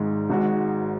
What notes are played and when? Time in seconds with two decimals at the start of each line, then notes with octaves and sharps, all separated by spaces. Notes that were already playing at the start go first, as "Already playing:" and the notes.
Already playing: G#1 G#2 G#3
0.30 G#1 G#2 G#3 F#4